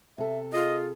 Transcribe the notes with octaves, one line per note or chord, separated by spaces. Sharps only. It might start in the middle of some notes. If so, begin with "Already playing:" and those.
C3 A4 E5
F4 G#4 D#5